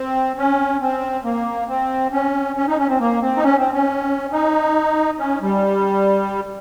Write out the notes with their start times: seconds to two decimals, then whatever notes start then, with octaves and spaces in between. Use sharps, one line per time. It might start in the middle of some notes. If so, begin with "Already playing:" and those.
Already playing: C4
0.38 C#4
0.81 C4
1.24 A#3
1.68 C4
2.12 C#4
2.56 C#4
2.68 D#4
2.78 C#4
2.89 C4
3.00 A#3
3.21 C4
3.37 D#4
3.43 C#4
3.58 C4
3.74 C#4
4.32 D#4
5.19 C#4
5.42 G3